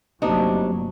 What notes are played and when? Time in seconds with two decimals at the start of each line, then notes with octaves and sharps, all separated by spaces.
0.22 G1 C3 F#3 A3 A#3 D4 D#4